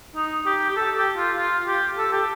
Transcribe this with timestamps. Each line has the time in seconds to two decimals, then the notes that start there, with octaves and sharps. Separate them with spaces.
0.16 D#4
0.46 G4
0.70 G4
0.76 A4
0.97 G4
1.17 F4
1.37 F4
1.67 G4
1.98 A4
2.13 G4